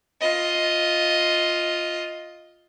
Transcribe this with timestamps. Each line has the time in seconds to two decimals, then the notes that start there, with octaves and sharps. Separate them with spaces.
0.21 F4 D#5